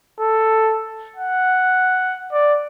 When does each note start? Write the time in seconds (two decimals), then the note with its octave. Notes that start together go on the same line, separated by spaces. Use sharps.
0.20 A4
1.16 F#5
2.33 D5